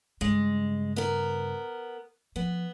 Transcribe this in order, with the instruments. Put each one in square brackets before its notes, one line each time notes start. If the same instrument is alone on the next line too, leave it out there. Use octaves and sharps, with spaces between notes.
[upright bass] G2 C#3 [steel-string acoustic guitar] G#3
[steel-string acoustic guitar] B3 A#4
[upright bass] F3 [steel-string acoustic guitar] B3